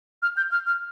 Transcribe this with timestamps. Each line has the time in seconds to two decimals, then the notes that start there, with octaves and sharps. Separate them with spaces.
0.22 F6
0.37 G6
0.51 F6
0.67 F6